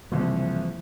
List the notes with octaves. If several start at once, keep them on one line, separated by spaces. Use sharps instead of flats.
F#1 C2 E3 F3